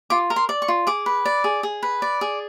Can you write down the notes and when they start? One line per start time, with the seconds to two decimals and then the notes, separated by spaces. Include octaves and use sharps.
0.10 F4 D6
0.30 A#4
0.36 C6
0.49 D5
0.62 C#6
0.68 F4
0.87 G#4 D6
1.06 B4
1.25 D5
1.44 G#4
1.63 G#4
1.83 B4
2.02 D5
2.21 G#4